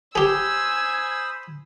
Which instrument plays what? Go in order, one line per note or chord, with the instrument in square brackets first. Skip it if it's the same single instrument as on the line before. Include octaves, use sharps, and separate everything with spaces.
[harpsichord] G4 G#4 [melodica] C5 B5 D#6 [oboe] G#5 [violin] E6